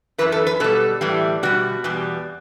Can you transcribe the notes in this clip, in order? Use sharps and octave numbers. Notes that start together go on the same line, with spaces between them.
F#2 C#3 E3 B4
A4
B4
B2 G3 A4
A2 E3 G3
B2 G3 F#4
E2 B2 G3